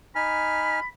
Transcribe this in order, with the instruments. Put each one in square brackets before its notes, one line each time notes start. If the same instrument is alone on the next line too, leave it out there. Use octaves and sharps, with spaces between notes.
[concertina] D#4 G#5 F6 [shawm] B5